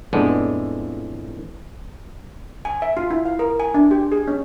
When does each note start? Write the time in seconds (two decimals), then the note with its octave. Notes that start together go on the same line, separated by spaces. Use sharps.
0.13 F2 A2 G#3 B3 D4
2.65 G#5
2.82 E5
2.97 F4
3.10 E4
3.26 F5
3.39 A#4
3.60 G#5
3.74 D4
3.91 G4
4.12 G#4
4.27 C#4